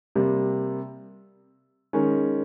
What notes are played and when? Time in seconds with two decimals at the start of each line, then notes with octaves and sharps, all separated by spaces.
0.16 C3 G3 A#3
1.93 D#3 G#3 C#4